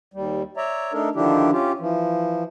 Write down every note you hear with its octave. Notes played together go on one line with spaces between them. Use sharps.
D#2 G3
C#5 D5 E5 A#5
A3 D4 D#4 A4 A#4
D3 D#3 F3 D4 E4 G4
C#4 F4 G4
E3 F3